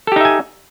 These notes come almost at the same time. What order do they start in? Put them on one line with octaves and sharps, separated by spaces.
A4 G4 D#4 E5 G#5